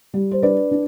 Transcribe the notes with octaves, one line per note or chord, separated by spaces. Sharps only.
G3
C5
D4 B4 D5
D4